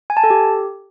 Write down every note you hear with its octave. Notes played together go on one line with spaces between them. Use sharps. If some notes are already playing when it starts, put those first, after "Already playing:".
G#5
A5
A4
G4